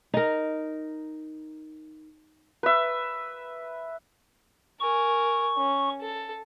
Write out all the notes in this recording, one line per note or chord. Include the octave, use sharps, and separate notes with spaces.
D#4 A#4
B4 E5
A#4 G#5 C#6
C#4
A4